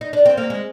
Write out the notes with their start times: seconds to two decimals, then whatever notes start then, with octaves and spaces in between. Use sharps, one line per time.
0.01 D#4
0.13 D4
0.26 C4
0.37 A#3
0.50 G#3